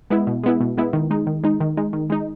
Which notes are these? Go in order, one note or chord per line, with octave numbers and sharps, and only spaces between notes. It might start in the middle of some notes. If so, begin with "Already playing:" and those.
G#3 B3 E4
B2
G#3 B3 E4
B2
G#3 B3 E4
D#3
G#3 D#4
D#3
G#3 D#4
D#3
G#3 D#4
D#3
G#3 D#4